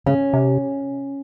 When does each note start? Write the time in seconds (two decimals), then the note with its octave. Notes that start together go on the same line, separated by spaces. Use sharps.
0.06 C#3 C#4
0.33 C3